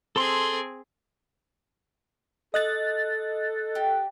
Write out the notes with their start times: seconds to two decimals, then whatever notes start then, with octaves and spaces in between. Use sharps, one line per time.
0.16 C4 G#4 A4 C6
2.54 A4 D#5 F#6 A6
3.75 G4